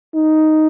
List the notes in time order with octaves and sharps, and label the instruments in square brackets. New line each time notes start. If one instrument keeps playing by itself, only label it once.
[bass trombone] D#4